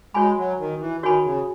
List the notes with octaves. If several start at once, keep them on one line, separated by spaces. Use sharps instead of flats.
G#3 F#4 C#5 G#5 B5
F#3
D#3
E3
D#3 F#4 C#5 G#5 B5
C#3